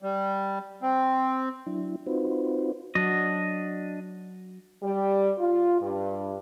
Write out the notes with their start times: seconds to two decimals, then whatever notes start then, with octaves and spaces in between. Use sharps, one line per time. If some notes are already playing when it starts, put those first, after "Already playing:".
0.02 G3
0.82 C4
1.66 F#3 D4 E4
2.07 C4 D#4 F4 F#4 B4 C5
2.95 F#3 D4 F#4 D#5
4.82 G3
5.38 F4
5.81 G2